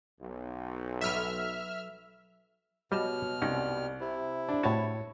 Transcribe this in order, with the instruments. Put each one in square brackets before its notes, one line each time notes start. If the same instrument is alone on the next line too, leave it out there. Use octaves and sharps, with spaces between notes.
[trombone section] B1
[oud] F#3 A4 B4 [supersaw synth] E5 F6
[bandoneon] B2 F6 [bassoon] F#3 [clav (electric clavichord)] G3 D#5 A5
[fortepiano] C2 [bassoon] G3 [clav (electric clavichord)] C#4 D#4 C#5
[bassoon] C3 [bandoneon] E4
[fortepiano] D4
[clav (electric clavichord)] A2 F#4 [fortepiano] C#5 A5